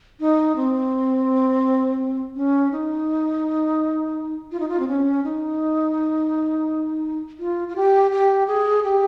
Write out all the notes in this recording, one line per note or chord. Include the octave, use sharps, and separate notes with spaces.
D#4
C4
C#4
D#4
F4
D#4
F4
C4
C#4
D#4
F4
F4
G4
G4
G#4
G4